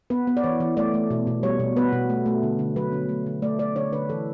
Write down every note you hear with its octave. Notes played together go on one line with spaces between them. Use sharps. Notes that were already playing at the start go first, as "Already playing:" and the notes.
B3 B4
B3
D5
E3 C#5
E3
A3 D5
A3
B2
B2
G3 C#5
B2
B3 B4
B2
A3
A3
D3
D3
F#3 B4
D3
A3
D3
A3 D5
A3 D5
D3 C#5
D3 B4
E3 A4